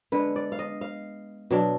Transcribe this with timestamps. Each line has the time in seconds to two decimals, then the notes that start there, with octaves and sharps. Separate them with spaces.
0.12 D3 G#3 B3 B4
0.36 D5
0.52 F5
0.59 D#5
0.81 F5
1.51 B2 F#3 D4